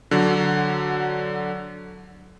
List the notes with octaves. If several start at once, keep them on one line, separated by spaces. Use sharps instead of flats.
D3 F#3